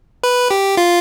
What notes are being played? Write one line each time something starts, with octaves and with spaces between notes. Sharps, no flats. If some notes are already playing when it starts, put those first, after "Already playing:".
B4
G4
F4